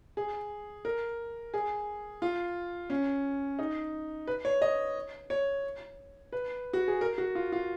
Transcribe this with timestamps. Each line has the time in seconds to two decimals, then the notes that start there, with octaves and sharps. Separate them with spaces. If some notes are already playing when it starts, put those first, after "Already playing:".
0.17 G#4
0.85 A#4
1.54 G#4
2.22 F4
2.90 C#4
3.59 D#4
4.27 B4
4.45 C#5
4.62 D#5
5.30 C#5
6.33 B4
6.73 F#4
6.88 G#4
7.01 A#4
7.18 F#4
7.35 F4
7.52 F4